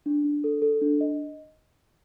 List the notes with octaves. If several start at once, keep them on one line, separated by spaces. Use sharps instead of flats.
D4
D4
A4
A4
D4
D#5